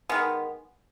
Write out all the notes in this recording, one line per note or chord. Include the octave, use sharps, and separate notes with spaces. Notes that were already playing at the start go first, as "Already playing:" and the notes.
D#3 G#3 B3